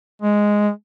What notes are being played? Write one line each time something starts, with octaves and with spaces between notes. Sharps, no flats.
G#3